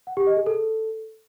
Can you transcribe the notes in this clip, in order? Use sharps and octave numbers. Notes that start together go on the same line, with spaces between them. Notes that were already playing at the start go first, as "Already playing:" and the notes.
F#5
G4
D#5
G#4
A4